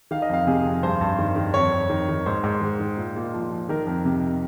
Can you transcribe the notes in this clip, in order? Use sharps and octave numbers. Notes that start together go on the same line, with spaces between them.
D#3 F5
D#5
F2 F5
C3 G#4
F2
G2 C5
G2
D#3
D#3
F2 C#5
F2
D#3
D#3
G#2 C5
G#2
D#3
D#3
A#2
A#2
F3
F3
D#3 A#4
F2
C3